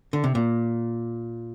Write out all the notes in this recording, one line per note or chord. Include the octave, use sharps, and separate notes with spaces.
D3
C3
A#2